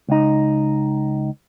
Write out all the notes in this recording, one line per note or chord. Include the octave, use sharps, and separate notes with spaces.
C#2 D#4